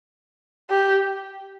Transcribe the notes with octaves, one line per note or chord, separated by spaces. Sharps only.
G4